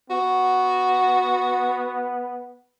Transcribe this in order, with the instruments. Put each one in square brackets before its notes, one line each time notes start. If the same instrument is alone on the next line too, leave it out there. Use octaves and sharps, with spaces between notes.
[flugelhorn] B3 [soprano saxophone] F#4